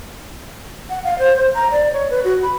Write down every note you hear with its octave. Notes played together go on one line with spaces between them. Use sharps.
F#5
F5
C5
C5
A#5
D5
C#5
B4
F#4
B5